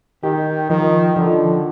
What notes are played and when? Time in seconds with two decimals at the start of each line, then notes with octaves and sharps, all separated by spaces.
0.23 D#3 G4
0.70 D#3 F3
1.16 D3 F3